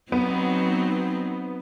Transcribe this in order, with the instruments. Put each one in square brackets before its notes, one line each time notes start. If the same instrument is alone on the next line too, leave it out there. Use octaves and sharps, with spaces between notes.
[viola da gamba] F#3 C4 D#4 [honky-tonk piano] B3